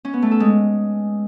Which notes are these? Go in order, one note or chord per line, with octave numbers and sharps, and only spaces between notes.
C#4
B3
A3
A4
G#3